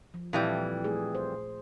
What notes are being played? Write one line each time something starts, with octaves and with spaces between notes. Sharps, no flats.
F3
F2 A#2 E3 G3
A3 G#4
C5